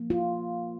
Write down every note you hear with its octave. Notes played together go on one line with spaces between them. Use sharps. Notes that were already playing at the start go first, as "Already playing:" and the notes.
Already playing: F3 A#3
F4